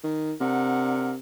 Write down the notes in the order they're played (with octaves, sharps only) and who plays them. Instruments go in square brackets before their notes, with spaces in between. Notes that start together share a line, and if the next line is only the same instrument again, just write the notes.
[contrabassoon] D#3
[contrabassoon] C3 [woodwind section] D4 A#4 F#5